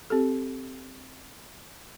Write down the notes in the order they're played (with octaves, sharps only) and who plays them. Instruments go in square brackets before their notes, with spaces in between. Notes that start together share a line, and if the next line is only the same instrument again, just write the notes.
[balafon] C4 G4 A4